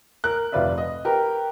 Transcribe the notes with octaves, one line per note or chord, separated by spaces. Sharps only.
A#4 F#6
F1 F4 B4 D5 E5
D#5
G4 A#4 B4